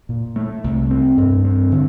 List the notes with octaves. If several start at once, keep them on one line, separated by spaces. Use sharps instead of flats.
A#2
A3
C2
C4
G2
C4
D3